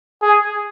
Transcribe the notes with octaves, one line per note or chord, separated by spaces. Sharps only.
G#4